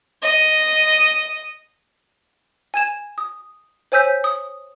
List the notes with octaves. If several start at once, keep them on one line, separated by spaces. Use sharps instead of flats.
D#5
G#5 G#6 E7
D#6
C5 C#5 G#5 E6 G6 B6
D#6